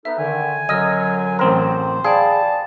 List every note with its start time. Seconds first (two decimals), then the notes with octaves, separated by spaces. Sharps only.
0.05 B3 D#4 A4 E5
0.19 D3 D#3 G#5
0.69 F#2 D3 F#3 D#5 E6 F6 D#7
1.39 A1 C4 A#4 C5
2.04 G#4 D5 F5 G5 A5 B5